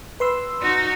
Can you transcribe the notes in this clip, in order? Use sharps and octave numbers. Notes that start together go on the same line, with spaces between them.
B4 C6 E6
D#4 F#4